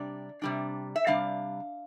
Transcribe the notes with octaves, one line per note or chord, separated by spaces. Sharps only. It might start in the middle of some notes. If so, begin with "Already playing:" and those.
Already playing: C3 G3 D4 D5
C3 G3 D4
E5
C3 G3 D4 F5